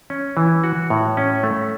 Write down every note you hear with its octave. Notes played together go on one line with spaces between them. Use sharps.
C#4
E3
F#4
A2
C#4
A3